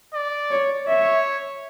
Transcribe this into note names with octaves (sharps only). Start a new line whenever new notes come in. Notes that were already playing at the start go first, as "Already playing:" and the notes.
D5
C#5
C#5 E5